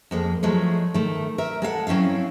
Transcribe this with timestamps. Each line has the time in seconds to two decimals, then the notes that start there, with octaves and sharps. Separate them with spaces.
0.11 F2 G#3 A#3
0.43 F3 F#3 G#3 A3
0.94 D#3 A3
1.38 A#4 E5
1.62 G#3 A4 F5 F#5
1.87 F#3 C4 C#4 E4 F5